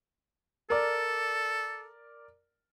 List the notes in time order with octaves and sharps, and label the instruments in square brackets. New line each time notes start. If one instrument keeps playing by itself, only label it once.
[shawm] A4 [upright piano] A#4 D5